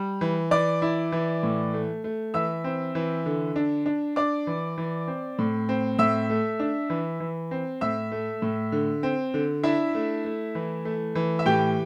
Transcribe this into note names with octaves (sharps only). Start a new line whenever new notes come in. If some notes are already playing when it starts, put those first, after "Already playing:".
Already playing: G3
E3
E3 D5 D6
E4
E3
A2
A3
A3
E3 E5 E6
C4
E3
D3
D4
D4
D4 D5 D6
E3
E3
C4
A2
C4
A2 E5 E6
A3
D4
E3
E3
C4
A2 E5 E6
A3
A2
D3
C4
D3
D4 E4 E5
A3
A3
E3
A3
E3
E5
A2 G4 G5